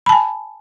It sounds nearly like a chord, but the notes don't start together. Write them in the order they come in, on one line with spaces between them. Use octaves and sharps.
B5 A5 G#5